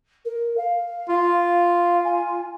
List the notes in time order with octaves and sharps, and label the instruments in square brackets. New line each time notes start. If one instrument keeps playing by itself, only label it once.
[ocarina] A#4
F5
[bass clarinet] F4
[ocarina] G#5